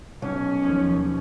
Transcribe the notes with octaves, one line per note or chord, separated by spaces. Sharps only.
B1 C#4
D#2 F3